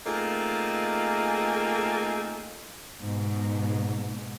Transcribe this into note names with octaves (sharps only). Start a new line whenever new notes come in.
A3 A#3 C4 D#4 F4 G#4
G#2 B2